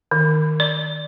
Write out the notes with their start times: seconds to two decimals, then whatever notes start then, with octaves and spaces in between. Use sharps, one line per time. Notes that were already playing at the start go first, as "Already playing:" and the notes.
0.11 D#3
0.60 D5